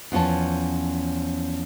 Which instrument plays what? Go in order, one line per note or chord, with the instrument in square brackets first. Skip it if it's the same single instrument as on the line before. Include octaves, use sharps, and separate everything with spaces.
[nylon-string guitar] E2 F3 C#4 C#5 A5